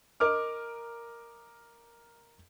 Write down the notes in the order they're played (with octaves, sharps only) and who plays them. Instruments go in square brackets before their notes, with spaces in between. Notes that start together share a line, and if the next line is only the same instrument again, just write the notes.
[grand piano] A#4 D#5 D6 F6